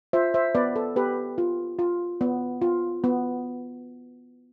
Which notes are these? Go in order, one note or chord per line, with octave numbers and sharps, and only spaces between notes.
F4 C5 E5
C5 E5
B3 B4 D5
A4
B3 G4 B4
F4
F4
B3
F4
B3